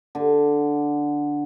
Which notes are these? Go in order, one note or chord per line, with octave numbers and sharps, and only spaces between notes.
D3